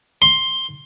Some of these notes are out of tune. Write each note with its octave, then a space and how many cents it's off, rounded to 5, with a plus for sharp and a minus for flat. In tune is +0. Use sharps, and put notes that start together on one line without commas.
C6 +10